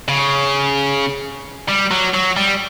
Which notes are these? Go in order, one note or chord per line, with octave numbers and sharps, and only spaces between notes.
C#3
G3
F#3
F#3
G3